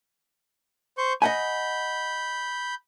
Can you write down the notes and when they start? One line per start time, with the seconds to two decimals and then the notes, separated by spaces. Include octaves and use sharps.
0.98 C5 C#6 G6
1.22 D#5 F#5 G#5 B5 G6